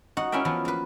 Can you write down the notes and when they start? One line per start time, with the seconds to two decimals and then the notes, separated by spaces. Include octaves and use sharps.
0.17 D#4 F#4 F#5
0.32 C#4 E4 A#4 E5 G5
0.45 E3 F3 B3
0.65 A#3 B4